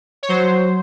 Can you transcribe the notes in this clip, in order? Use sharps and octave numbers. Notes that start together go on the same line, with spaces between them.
C#5
F#3 C5